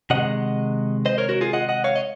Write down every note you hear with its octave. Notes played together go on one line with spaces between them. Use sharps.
C3 D#3 G#3 D#5 F#5
C5 D#5
A#4 C#5
F#4 A#4
F4 G#4
D#5 F#5
D#5 F#5
C#5 F5
D#5